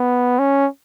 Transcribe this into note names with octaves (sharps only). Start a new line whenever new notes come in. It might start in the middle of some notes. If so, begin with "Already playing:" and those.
Already playing: B3
C#4